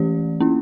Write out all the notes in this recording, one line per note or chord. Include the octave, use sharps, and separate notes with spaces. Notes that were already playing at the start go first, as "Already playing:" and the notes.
Already playing: E3 A3 C#4 G4 D5
A#3 C#4 E4